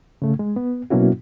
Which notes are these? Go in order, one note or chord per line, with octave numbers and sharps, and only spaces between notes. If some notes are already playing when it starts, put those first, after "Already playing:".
C#3 A3
G#3
B3
B2 F#3 A#3 C#4 E4 F#4